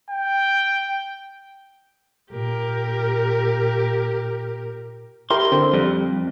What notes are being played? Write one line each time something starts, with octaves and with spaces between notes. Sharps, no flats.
G5
A#2 G4 A#4
E4 G4 A#4 C6
D3 C4
F2 G3